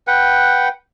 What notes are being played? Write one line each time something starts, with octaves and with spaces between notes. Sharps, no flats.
B4 F#5 G5